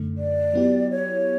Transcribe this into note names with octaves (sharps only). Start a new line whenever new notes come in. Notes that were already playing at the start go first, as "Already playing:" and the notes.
Already playing: F#2 D3 A3
D5
F#3 B3 E4 G4
C#5